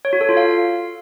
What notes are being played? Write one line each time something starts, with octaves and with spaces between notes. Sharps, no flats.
C#5
F#4
A4
F4
F5